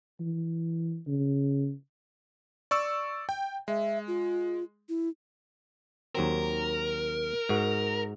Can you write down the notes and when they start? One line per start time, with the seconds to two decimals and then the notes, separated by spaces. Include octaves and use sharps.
0.20 E3
1.07 C#3
2.71 D5 C#6 E6
3.29 G5
3.68 G#3 E5
4.08 F4
4.89 E4
6.15 D#2 F#3 C4 A#4
7.49 G#2 F#4